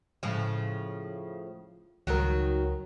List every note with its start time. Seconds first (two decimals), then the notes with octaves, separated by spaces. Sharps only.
0.23 A2 C#3 F3
2.07 C#2 D#3 F#3 A#4